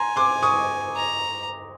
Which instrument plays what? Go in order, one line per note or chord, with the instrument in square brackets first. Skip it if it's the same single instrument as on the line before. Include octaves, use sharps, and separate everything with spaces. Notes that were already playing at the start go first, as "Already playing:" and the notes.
Already playing: [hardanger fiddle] G#5 [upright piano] A#5 C6
[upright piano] C6 D6
C#6 D#6
[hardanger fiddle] A#5